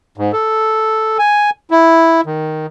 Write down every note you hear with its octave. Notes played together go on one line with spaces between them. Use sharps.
G#2
A4
G#5
E4
D#3